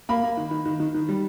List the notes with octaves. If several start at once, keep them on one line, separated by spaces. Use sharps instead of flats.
A#3 B5
A#3
D#3
D#3
D#3
D#3
D#3
G3